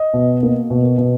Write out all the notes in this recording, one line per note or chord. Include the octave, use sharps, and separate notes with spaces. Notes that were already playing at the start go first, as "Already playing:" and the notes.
Already playing: D#5
B2
A#3
B2
B2